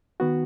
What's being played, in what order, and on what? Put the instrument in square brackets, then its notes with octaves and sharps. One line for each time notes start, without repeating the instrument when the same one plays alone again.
[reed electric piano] D#3 B3 F#4